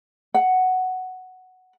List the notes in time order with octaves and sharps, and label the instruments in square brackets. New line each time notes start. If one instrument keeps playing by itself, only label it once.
[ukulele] F#5